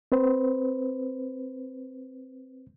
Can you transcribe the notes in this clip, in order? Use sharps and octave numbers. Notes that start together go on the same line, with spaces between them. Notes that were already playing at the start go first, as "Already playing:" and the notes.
C4 B4 C5